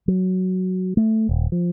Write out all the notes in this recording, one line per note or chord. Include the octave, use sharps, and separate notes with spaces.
F#3
A3
D#1
F3